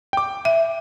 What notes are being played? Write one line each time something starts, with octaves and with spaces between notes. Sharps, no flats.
G5 D6
E5